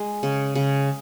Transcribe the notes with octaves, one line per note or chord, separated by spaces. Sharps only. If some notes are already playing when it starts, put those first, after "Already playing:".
Already playing: G#3
C#3
C#3